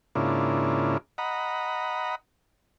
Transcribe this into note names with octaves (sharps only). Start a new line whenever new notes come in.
G#2 C#3 A#3 D4 E4 F4
D#5 F#5 A#5 B5